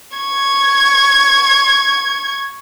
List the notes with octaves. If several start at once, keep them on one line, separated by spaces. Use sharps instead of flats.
C#6 G#6